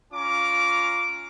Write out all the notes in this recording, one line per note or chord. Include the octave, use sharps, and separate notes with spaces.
C#4 F4 A#5 D6